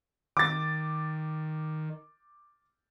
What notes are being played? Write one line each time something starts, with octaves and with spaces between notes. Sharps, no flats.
D#3 D6 A6